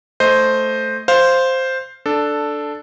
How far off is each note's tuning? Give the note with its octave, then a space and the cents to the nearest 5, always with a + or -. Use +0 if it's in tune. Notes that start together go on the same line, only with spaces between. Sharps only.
A3 +0 C5 +0 D#5 +0
C5 +0 F5 +0
D4 +5 A4 +0